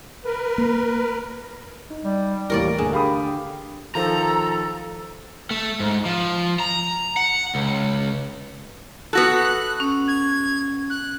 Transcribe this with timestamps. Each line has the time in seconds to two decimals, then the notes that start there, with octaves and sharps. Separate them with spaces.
0.25 A#4 B4
0.58 A#3
1.90 D#4
2.04 G3
2.50 D#2 A2 E3 G3 A#4 C#5 D5
2.78 D#2 A2 D3 G#4
2.93 G4 F5 B5 D#6
3.95 D#3 F3 A4 A#5
5.51 A3
5.80 G#2
6.05 F3
6.60 A#5
7.17 F#5
7.55 C#2
9.13 B3 F#4 A4 F#6
9.80 C#4
10.08 G#6
10.90 F#6